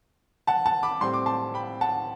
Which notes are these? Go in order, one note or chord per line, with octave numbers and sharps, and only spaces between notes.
F#5 A5
F#5 A5
B5 D6
A2 G3 C4 C6
D6
A5 C6
G5 B5
F#5 A5